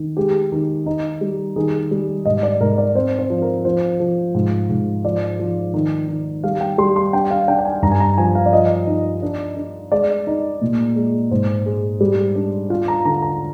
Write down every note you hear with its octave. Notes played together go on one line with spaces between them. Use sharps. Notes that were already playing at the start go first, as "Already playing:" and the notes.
Already playing: D#3
G#3 G4
D#3
D#4
G3
D#3 G#4
G3
G#2 D#5
D5
G#2 A#4
D5
C4 C5
C5
F3
A#4
F3 C5
F3
G#2
G#2
F3 D5
F3
D#3
D#3
G3 F5
G5
G3 C6
C6
D4 G5
F5
D4 G5
G5
G#5
G2 A#5
G#5
A#5
F3 G#5
F5
D5
F3 D#5
D#4
D4
D4
G#3 D5
D#4
A#2
G#3
G#2 C5
G#3
G3
D4
F4 F5
A#5
D3 A#5
A#5